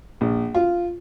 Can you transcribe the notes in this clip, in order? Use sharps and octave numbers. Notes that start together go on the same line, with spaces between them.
A#1
F4